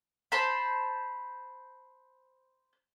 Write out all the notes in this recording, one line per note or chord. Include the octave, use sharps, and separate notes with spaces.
C5 A5 B5